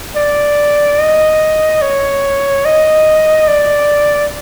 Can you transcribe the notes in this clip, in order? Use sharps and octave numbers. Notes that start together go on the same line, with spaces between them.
D5
D#5
C#5
D#5
D5